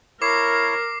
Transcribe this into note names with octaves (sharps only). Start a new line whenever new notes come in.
E4 A#4 C#5 D6 C7